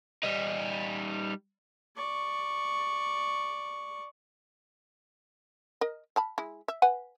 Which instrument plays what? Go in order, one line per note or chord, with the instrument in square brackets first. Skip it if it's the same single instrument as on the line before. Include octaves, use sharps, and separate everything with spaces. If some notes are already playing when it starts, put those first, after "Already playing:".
[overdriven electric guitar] G3 D#4
[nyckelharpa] D5 C#6
[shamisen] A#4 D#5
F5 A5 B5
G#3 E4
E5
B4 F#5 G#5